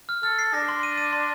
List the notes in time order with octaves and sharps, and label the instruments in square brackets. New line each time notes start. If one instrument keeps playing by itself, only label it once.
[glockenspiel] F6
[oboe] A4 [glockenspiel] F6
[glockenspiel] C7
[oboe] D4 [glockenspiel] A#6
[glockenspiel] C6
D#7
D#7
C6